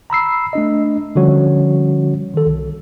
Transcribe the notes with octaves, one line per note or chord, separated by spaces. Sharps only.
A#5 B5 E6 C7
A3 D4 D#5
D3 F3 G3 C#4 F#4 C#5
D#3 A4
C2